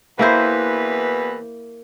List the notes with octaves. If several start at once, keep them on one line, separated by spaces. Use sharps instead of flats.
E2 B2 A#3 E4 B4 C5